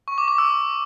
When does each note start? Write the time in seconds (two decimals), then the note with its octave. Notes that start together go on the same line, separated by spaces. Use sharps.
0.08 C#6
0.18 D6
0.28 D6
0.38 E6